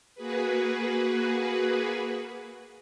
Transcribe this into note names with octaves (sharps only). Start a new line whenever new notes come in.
A#3 F#4 G#4 B4